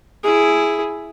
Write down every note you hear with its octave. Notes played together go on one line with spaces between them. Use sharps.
E4 G#4